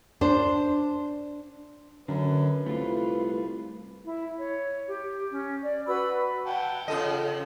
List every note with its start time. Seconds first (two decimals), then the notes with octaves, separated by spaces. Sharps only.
0.21 D4 C5
2.08 F#2 D3 B4
2.66 C2 A3 F4
4.03 E4
4.38 C#5
4.86 G4
5.30 C#4
5.62 D5
5.87 F#4 B4 B5 E6
6.47 F#5 G5 A5
6.88 C#3 F3 A4 D#5